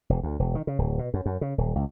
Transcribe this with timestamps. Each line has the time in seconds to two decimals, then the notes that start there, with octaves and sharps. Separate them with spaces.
0.10 E1
0.23 D2
0.39 E1
0.55 D#3
0.67 C#3
0.78 D1
0.99 B2
1.14 F#2
1.26 F#2
1.41 C#3
1.58 D#1
1.75 C#2